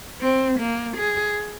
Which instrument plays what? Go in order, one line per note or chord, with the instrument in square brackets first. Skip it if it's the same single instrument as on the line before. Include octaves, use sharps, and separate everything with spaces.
[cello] C4
A#3
G#4